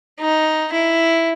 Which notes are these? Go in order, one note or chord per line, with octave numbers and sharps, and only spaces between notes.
D#4
E4